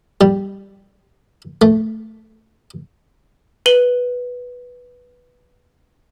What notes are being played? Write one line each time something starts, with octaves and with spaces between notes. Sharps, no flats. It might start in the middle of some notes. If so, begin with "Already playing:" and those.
G3
A3
B4 D#7 F#7 G7